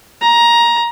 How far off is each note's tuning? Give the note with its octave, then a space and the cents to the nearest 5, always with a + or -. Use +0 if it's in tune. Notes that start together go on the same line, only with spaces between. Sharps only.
A#5 +15